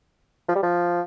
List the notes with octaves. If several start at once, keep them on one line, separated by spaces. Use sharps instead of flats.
F3
G3
F3